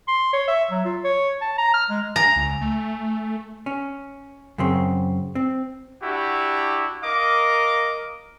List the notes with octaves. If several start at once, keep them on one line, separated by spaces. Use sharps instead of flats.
C6
C#5
E5
F#3
F4
C#5
A5
A#5
F6
G#3
G#5 A#5 A6 F7
C#2
A3
C#4
F#2 C#3 C4
C4
D4 E4 F#4 G4
A#4 D#5 F5 D6